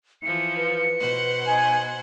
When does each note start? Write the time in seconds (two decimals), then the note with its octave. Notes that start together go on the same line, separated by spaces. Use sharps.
0.22 E3 F3 C#7
0.56 B4
1.00 B2 C5 F#5
1.47 D#4 G#5 G#6